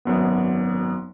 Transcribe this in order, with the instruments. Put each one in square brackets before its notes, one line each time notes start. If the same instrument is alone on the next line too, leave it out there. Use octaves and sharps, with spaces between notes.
[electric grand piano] G#1 F#2 B3